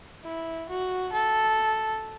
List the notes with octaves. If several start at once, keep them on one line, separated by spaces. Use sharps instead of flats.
E4
F#4
A4